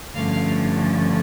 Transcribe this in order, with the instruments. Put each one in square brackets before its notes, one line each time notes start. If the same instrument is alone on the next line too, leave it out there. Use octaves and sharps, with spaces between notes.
[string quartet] G2 D3 F3 A3 C#4 F5